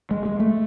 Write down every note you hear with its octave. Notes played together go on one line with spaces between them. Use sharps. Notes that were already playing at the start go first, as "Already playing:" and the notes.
G#3
G#3
A3